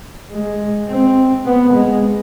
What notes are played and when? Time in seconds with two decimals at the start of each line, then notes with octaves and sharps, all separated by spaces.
0.32 G#3
0.88 C4
1.46 B3
1.74 G#3